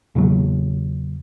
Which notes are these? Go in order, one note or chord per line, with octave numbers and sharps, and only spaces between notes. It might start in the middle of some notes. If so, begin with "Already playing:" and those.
E2 A#2 C#3 F#3